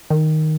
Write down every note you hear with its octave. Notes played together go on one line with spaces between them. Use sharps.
D#3